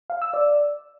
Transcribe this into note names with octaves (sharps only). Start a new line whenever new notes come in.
F5
E6
D5